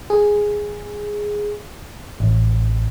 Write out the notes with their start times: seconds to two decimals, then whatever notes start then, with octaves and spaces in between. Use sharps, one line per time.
0.10 G#4
2.20 A1